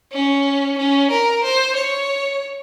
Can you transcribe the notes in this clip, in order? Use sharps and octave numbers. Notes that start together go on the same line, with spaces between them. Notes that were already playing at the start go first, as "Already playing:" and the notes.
C#4
C#4
A#4
C5
C#5